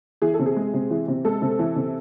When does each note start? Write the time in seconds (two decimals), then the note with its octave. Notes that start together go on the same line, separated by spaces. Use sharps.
0.22 E3 G#4
0.34 A4
0.39 C3
0.46 G#4
0.56 G#3
0.74 C3
0.91 E3
1.08 C3
1.25 G#3 A4
1.42 C3
1.59 E3
1.76 C3